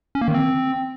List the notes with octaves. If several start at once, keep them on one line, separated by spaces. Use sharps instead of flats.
C#4
A#3
D#3
C4